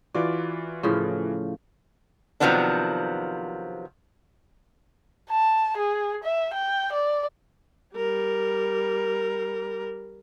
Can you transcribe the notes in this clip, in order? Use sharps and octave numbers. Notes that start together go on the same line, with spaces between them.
E3 F4 F#4 D5
A2 C#3 F3
C3 D#3 F3 F#3 B3 D4
A5
G#4
E5
G5
D5
G3 A#4